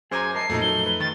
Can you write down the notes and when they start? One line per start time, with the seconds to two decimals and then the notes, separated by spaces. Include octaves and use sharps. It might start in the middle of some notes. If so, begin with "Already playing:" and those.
0.11 F#2 G#4 C5 G#5 A#5 D6
0.35 A#4 D#5 A5 C7
0.50 F2 A#2 A3 D#4 F#4 A#4
0.62 F#3 G7
0.86 B4
1.00 D#3 A6